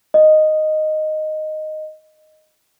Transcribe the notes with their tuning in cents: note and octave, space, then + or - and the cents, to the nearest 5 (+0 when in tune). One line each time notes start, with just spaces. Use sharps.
D#5 -5